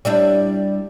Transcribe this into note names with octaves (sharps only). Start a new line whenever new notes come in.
G3 D4 E4